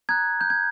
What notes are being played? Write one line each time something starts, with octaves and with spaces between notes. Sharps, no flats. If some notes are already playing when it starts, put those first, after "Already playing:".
A#5 D#6 F#6 G#6
G6
G#6